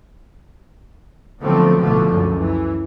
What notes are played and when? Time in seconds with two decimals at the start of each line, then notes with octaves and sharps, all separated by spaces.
1.42 D3 F3 F#3 A3 B3 C4
1.79 A1 B2 D3 F3 A3
2.11 C#2 F#2 D3
2.39 E3